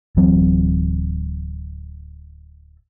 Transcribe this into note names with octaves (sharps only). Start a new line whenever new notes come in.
D1 E3 F#3 C4